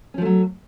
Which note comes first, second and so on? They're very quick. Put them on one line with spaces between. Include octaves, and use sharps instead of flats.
C#4 F3 A3 F#3